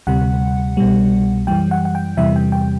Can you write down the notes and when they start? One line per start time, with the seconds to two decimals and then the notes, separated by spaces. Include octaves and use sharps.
0.07 D2 C3 G3 F#5
0.77 C2 B2 G3
1.47 F#2 E3 G3 G5
1.71 F#5
1.85 F#5
1.95 G5
2.17 E2 C3 E3 G3 E5
2.36 G5
2.52 G5